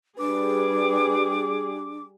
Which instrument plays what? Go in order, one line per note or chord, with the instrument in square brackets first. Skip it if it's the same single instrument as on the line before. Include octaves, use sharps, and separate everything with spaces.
[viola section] G3 G#4 [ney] D4 [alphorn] B4 [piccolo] D6